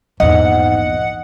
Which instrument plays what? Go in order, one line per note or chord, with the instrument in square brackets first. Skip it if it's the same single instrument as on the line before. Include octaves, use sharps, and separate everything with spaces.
[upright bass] A#1 E2 [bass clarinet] G#2 [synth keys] D#5 [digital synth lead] F#5